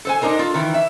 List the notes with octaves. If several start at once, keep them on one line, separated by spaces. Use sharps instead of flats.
A4 C5 G#5
D4 D#4 A#4 C5
F4 A4
D#3 E3
E5